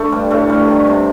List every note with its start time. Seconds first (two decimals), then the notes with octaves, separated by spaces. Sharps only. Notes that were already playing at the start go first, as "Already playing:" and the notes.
Already playing: D3 A3
0.12 G2 G3
0.31 A2 A3
0.49 G2 G3
0.67 D#3
0.87 C3